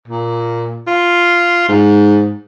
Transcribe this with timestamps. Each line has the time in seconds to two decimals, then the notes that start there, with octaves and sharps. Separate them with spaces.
0.08 A#2
0.87 F4
1.69 G#2